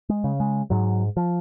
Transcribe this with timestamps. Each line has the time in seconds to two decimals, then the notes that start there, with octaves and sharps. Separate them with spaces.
0.09 G#3
0.24 C#3
0.40 G#3
0.70 G#2 F#3
1.17 F3